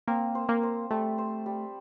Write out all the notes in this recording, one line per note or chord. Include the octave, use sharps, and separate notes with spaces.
A#3 C4
C5
A#3
C5
G3 A3
C5
G3